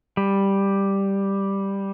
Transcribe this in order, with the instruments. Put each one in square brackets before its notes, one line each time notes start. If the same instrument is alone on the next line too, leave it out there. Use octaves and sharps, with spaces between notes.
[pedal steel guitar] G3